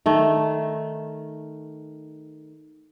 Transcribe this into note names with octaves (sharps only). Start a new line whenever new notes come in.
D#3 A3